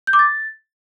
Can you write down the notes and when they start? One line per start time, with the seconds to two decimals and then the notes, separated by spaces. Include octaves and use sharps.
0.07 G6
0.13 D6
0.19 A6